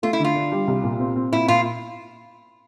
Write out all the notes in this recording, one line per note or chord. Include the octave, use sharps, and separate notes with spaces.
A3 F4
E4
D3 F4
D4
G3
C2
A#2
C4
C4
A#2 E4
A#2 F4